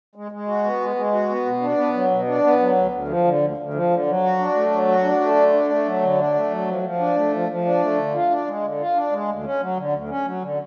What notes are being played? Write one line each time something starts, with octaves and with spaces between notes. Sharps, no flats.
G#3
G#3
F#4
B3
G#3
G#3
F#4
B3
B2
D4
B3
F#3
B2
D4
B3
F#3
D2
D2
F3
D3
D2
D2
F3
D3
F#3
F#4
D4
A3
F#3
F#4
D4
A3
D3
D4
A3
F#3
D3
D4
A3
F#3
F3
F3
D4
A3
F3
F3
D4
A3
D3
F4
D4
G#3
D3
F4
D4
G#3
D2
C#4
F#3
D3
D2
C#4
F#3
D3